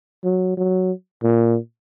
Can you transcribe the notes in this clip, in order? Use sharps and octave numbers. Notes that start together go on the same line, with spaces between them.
F#3
F#3
A#2